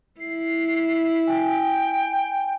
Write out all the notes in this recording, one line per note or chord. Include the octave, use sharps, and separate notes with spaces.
E4 C7
G5 G#5